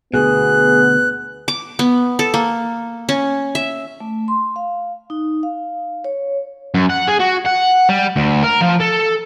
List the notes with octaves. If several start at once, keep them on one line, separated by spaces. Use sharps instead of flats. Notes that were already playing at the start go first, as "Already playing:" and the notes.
D2 G2 B2 B3 G#4 F#6
D6
B3
A4
A#3
C#4
E5
A3
C6
F5
D#4
F5
C#5
F#2
F#5
G#4
F#4
F#5
G3
D2
A#4
F3
A4